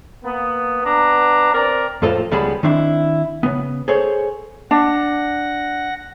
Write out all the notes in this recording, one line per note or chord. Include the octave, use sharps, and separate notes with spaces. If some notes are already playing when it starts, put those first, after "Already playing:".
A#3 B3
B3 D4 A#5
C4 A#4 D5
F2 A2 F4 A4 C5 F5
C#2 G3 B3 G#4 A5 B5
D#3 C4 D4 E4
C#3 B3
G#4 A4 C5 C#5
D4 F#5 A#6